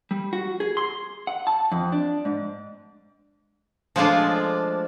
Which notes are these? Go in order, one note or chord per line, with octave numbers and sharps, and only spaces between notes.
G3
F#4
G#4
C6
F#5
A5
F2
D4
G#2
F3 G#3 A3 D4 F4 D5